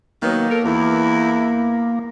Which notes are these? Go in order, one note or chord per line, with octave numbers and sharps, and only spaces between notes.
D#3 F#3 A#3 B3
A4 A#4
E2 E3 E4